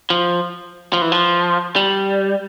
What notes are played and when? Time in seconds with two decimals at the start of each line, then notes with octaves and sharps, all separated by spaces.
0.10 F3
0.93 F3
1.02 E3
1.12 F3
1.76 G3